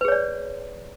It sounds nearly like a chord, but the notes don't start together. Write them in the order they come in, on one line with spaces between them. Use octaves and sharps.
B4 G#4 C#5 D5